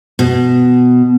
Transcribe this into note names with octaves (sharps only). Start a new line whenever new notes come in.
B2